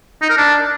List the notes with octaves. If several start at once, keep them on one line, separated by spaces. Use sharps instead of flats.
D#4
A#4
D4